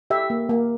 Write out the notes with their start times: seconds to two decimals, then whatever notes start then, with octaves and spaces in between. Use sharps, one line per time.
0.10 G4 E5
0.30 A#3
0.49 A#3